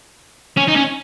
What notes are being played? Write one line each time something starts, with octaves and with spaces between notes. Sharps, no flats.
C#4
D#4
C#4